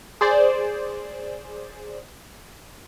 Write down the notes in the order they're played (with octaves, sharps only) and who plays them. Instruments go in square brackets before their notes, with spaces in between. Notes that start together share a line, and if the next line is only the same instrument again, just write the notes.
[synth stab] G#4 C5 D5